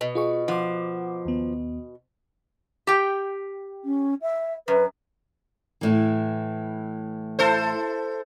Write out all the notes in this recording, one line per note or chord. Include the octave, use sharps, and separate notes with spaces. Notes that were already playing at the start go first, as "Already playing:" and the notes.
B2
F4 G#4 C#6
F3 F#5 D6
D#2 B3
G4 G5
C#4
E5
F#2 B4
A2 E3
E4 A4 C5